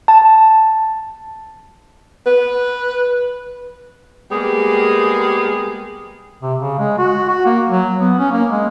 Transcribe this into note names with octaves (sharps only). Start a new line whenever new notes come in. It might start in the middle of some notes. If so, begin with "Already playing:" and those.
A5
B4
G3 G#3 A#3 B3 G4 G#4
C3
C#3
G#3
F#4
F#4
A#3
F#3
B3
C#4
A#3
G#3